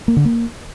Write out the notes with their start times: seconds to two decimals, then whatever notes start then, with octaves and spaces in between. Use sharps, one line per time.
0.08 A#3
0.17 D3
0.25 A#3